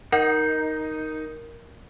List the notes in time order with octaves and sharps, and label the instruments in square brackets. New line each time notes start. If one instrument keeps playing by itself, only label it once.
[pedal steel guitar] D#4 [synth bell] A#4 [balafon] F#5